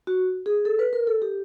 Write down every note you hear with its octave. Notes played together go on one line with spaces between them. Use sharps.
F#4
G#4
A4
B4
A#4
A4
G4